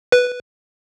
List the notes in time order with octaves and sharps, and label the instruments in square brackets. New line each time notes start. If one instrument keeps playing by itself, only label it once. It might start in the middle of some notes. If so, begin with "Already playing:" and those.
[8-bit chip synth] B4